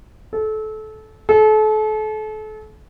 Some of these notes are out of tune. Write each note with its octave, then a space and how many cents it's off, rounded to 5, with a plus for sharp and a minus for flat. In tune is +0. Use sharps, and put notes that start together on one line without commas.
A4 -25
A4 -35